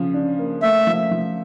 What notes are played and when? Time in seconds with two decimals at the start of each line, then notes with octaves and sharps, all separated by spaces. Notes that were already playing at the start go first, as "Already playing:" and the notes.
Already playing: C#3 F3
0.14 D4
0.39 A#3
0.62 A3 E5
0.87 F3
1.11 F3